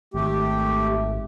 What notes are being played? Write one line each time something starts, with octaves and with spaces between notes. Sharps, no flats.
G#1 A3 G4